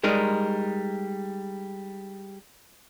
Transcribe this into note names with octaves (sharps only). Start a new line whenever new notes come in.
G3 G#3 D#4 A#4